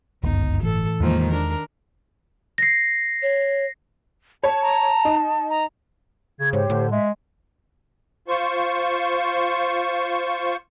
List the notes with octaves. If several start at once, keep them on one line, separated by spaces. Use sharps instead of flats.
G1 C#2 F#2 B3 D#4
A2 E3 A4
E2 D#3 F3 G#3 A#3
D4 A#4
A#6 C7
C#5
C#5 A5
A#5
D#4
A#5
C#3 G#6
G#2 G4 C5 C#5
A2 D3
G#3 E5
F4 C5 C#6